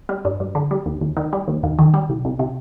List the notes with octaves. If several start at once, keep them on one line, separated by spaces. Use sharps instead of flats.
G3
G2
G2
D3
G3
D#2
D#2
D#3
G3
D#2
D#2
D#3
G3
C2
C2
C3